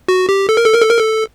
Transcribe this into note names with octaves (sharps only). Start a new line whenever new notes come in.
F#4
G4
A4
A#4
A4
A#4
A4
A#4
A4